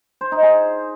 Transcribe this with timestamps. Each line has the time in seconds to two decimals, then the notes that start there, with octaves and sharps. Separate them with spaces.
0.21 C5
0.32 D#4
0.43 G#4